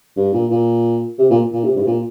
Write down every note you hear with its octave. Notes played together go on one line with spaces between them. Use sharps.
G2
A#2
A#2
C3
A#2
A#2
C3
G2
C3
A#2